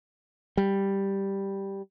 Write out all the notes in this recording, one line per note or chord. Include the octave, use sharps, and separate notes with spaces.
G3